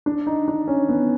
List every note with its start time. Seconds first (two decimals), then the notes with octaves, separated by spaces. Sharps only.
0.06 D4
0.27 D#4
0.48 D4
0.68 C#4
0.89 B3